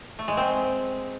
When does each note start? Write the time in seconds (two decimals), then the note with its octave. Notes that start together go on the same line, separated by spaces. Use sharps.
0.19 A3
0.28 G#3
0.37 C4